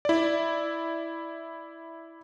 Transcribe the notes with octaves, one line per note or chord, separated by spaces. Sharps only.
E4 D5